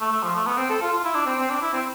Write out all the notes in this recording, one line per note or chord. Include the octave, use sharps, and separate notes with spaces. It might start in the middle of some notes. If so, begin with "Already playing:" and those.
A3
A3
F3
A3
B3
C4
A4
F4
F4
E4
D4
C4
C4
D4
E4
C4